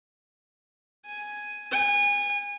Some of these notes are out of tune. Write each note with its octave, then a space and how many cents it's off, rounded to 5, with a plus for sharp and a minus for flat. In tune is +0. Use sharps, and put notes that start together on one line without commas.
G#5 +5
G#5 -30